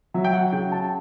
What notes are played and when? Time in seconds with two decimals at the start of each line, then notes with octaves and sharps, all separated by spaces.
0.14 F#3 E5
0.24 G5
0.33 F#5
0.53 C#3 G5
0.72 A5